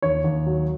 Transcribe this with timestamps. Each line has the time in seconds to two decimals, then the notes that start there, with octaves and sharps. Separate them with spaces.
0.02 D#2 C#5
0.24 D#2
0.46 F#3